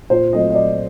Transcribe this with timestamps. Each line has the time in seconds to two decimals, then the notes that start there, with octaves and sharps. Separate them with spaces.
0.10 A#2 C5
0.33 F#3 A3 C4 D#5
0.50 D#5
0.55 A#2 D5